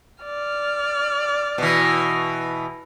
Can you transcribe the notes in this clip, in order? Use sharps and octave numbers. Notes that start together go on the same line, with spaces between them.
D5 F6
B2 E3